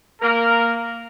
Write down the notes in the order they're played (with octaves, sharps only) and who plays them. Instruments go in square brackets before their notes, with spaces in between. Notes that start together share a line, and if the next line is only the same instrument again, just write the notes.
[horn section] A#3 A#4